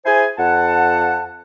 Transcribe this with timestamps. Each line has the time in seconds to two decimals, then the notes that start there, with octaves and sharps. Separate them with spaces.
0.05 E4 G#4 C5 G#5
0.38 F2 F#5 A5